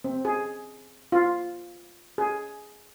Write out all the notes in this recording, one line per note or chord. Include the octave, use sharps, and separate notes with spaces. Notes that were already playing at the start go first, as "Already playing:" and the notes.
C4
G#4
F4
G#4